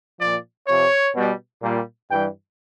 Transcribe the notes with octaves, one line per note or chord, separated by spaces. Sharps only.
A#2 F3 D5
C3 F3 C#5
B2 G3
A#2 G3
G2 E3 G3 G5